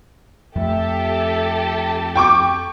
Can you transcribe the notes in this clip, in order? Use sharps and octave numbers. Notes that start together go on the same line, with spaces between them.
F2 A3 G4 A4 E5 A5
G5 C#6 D6